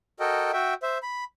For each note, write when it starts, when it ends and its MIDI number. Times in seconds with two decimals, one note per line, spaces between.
0.20 0.51 66
0.20 0.51 69
0.20 0.51 70
0.20 0.51 75
0.20 0.51 79
0.53 0.74 66
0.53 0.74 76
0.53 0.74 79
0.83 0.98 72
0.83 0.98 76
1.03 1.24 83